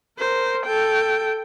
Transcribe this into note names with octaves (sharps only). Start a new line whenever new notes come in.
A#4 C5
A4 G5